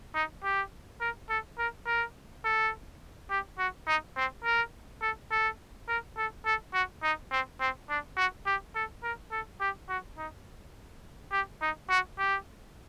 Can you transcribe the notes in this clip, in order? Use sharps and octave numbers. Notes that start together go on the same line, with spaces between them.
D#4
G4
A#4
A4
A#4
A#4
A4
G4
F#4
D#4
C4
A#4
A4
A4
A#4
A4
A4
F#4
D#4
C4
C4
D4
F#4
G4
A4
A#4
A4
G4
F#4
D#4
G4
D#4
F#4
G4